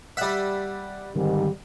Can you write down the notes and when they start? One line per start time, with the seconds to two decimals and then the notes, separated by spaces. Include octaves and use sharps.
0.17 G3 E5 F#5 F#6
1.15 G#2 D3 D#3 G3 C4